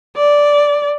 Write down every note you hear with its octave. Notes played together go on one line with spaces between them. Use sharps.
D5